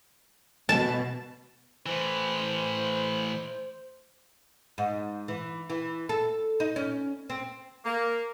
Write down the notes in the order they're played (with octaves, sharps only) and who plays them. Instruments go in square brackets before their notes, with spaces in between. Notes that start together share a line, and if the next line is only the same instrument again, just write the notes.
[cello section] B2 [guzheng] A5
[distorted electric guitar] A2 E3 [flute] C5
[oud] G#2
E3
E3
A4
D#4
C#4
C4
[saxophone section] A#3